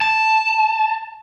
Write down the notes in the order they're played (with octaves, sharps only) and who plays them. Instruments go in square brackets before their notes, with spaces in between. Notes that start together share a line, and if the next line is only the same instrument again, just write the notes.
[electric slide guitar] A5